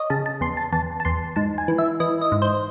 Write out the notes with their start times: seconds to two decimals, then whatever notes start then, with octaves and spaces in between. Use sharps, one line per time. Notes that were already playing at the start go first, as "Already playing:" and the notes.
Already playing: C#5 D#5
0.10 C#3 A5
0.26 A5
0.41 E2 C6
0.57 A5
0.73 E2 A5
1.00 A5
1.05 E2 C6
1.36 G#2 A5
1.58 G#5
1.68 E3
1.78 E5
2.00 E3 D#5
2.21 D#5
2.32 G#2
2.42 C5